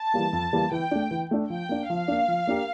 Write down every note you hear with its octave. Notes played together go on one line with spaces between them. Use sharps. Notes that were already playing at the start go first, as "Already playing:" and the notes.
Already playing: A5
E3 G3 A#3
F2
E3 G3 A#3
E3 G5
A3 D4
E3
A3 D4
F3 G5
A#3 D4
F3 F5
A#3 D4
F3
A#3 D4 G4 A#4